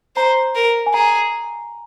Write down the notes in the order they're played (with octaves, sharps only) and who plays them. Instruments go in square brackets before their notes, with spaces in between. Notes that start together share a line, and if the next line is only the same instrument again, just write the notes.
[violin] C5 [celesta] A#5
[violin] A#4
[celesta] G#5
[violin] G#4 [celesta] A#5